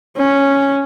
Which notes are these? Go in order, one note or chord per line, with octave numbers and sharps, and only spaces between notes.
C#4